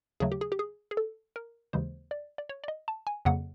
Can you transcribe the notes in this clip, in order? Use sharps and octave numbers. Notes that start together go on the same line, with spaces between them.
D#2 C#3 F#3 A3 G#4
G4
G#4
G4
G#4
G#4
A4
A#4
D#2 C#3 E3 G#3 C5
D5
D5
C#5
D5
D#5
A5
G#5
F2 C#3 F#3 A#3 F#5